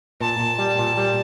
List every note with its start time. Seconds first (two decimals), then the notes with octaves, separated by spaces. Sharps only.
0.21 A#2 A5
0.40 A#2
0.58 G3
0.79 A#2
0.97 G3